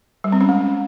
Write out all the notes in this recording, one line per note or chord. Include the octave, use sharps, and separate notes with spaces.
G3
C4
C#4
G#3